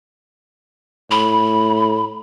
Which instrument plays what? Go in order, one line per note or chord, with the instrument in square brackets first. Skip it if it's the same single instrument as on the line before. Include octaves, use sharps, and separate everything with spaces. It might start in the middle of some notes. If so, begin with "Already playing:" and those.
[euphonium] A2 [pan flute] B5